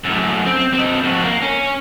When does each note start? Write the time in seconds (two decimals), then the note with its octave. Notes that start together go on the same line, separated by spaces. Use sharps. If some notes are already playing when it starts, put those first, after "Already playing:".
0.04 F#2 A2
0.46 C4
0.74 C4 D#5
1.04 F2 F#4
1.23 A#3
1.42 C#4